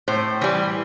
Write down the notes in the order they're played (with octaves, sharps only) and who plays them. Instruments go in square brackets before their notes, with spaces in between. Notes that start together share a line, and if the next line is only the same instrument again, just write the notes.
[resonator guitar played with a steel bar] A2 C5
E3 G3